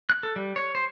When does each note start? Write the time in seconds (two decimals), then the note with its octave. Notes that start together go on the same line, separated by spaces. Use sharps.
0.10 F#6
0.23 A4
0.36 G3
0.56 C#5
0.75 C5